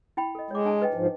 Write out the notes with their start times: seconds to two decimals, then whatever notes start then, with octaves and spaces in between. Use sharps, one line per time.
0.17 E4 G5 B5
0.35 A4 D#5
0.51 G#3 C#5 D6
0.65 D4 G#5 A5
0.82 B4 D#5 G5
0.94 G#2 F3